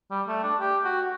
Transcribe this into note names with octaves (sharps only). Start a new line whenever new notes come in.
G3
A3
D4
G4
F#4